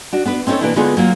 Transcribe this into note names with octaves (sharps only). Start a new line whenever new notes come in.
D4 F#4
B3 D4 B4
C4 C#4 D#4 F#4 A4 C#5
B2 E3 A#3 D4 E4
D3 G#3 B3 D#4 F4 G#4
F#3 A#3 F4